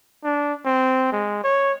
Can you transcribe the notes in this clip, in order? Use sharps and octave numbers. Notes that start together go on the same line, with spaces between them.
D4
C4
G#3
C#5